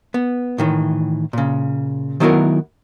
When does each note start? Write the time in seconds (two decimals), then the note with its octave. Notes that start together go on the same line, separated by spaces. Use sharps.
0.14 B3
0.58 A2 D#3 E3
1.33 A#2 C#3
2.20 D#3 F#3 B3 E4 F#4 A#4